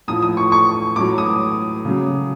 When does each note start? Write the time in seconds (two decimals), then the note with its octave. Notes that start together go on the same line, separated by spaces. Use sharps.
0.08 A2 F3 D#6
0.22 D#6
0.37 C#6
0.52 C#6
0.96 A2 F#3 D6
1.18 D#6
1.85 C#3 F#3